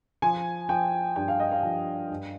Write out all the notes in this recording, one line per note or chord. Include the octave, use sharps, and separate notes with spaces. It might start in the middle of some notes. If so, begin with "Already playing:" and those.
F3 G#5
F3 G5
G2 G5
F5
D#5
F5
F3
G2